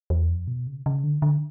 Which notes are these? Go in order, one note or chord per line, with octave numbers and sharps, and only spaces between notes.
E2
F2
B2
C#3
C#3
D3
D3